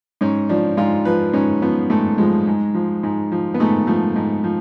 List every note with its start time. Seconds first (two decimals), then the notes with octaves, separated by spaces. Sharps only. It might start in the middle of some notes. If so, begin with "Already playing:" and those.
0.21 G#2 C#4
0.49 F3 D4
0.77 G#2 F4
1.05 F3 B4
1.34 G#2 C#4
1.62 F3 B3
1.90 G#2 A3
2.18 F3 G#3
2.47 G#2
2.74 F3
3.03 G#2
3.32 F3
3.54 B3
3.60 G#2 A3
3.87 F3 A3
4.16 G#2
4.44 F3